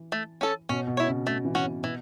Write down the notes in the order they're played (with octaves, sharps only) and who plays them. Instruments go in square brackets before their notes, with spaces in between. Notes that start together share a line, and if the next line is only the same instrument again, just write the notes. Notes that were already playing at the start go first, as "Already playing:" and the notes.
Already playing: [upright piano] E3
[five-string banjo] A3
C#4 A4
[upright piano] B2 [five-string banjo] C#4
[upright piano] B2
[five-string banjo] E4 C#5
[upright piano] C#3
[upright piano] C#3 [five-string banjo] A3
[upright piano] E3
[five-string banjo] C#4 F#4
[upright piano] B2
[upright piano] B2 [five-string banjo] E3